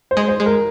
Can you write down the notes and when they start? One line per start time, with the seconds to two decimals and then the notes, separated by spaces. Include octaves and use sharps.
0.11 C5
0.17 G#3
0.28 C5
0.40 G#3
0.46 A#4